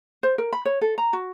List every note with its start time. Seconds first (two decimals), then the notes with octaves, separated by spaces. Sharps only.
0.23 C5
0.38 A#4
0.53 B5
0.65 C#5
0.81 A4
0.98 A#5
1.13 F#4